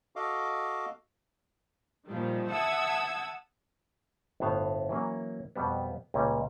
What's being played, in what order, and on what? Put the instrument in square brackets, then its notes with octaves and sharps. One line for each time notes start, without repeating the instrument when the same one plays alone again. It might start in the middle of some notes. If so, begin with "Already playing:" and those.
[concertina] F#4 A4 D#5 F5 D6
[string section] A#2 D#3 F3 G3
E5 F#5 A5 D#6 E6 G#6
[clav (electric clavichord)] G1 A2 B3 C5 F5
E3 F#3 A#3 C#4
F2 B2 G3 B3
C#2 A#2 G3 C#4